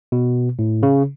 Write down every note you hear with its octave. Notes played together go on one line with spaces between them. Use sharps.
B2
A2
C#3